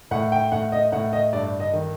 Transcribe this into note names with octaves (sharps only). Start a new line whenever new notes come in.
A2 F#5
G5
A2 F#5
D#5
A2 F#5
D#5
G2 D5
D#5
D#3